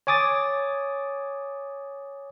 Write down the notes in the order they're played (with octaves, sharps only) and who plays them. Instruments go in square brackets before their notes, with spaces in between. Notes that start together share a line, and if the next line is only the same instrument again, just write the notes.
[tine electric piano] C#5 G#5 D6 D#6 A6